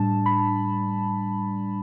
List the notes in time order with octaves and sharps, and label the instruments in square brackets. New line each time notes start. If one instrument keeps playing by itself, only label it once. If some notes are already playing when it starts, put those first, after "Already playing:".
Already playing: [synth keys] A2 G3 D4 A5
B5